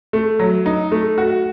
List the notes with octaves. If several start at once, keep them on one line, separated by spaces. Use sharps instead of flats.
A3
F#3
D#4
A3
F#4